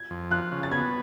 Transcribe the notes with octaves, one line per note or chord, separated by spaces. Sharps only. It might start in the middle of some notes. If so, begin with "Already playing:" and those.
Already playing: G#6
F2
F3 F#6
C#3
A6
B3 G#6